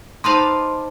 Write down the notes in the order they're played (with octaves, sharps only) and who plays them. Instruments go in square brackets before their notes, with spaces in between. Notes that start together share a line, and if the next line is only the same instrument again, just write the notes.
[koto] D#4 B4 F5 [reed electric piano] C5 A5 D6 [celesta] C6